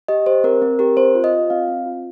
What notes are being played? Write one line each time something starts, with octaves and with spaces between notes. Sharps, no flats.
G4 D#5
G4 C5
C4 A#4
C4
G4 A#4
C4 C5
F4
D#5
F4
C4 F5
C4
F4